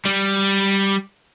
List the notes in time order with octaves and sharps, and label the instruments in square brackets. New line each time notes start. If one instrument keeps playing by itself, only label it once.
[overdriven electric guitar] G3